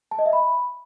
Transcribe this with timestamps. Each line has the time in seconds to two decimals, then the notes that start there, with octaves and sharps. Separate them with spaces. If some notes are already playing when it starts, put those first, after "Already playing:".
0.11 A5
0.19 D#5
0.26 E5
0.33 B5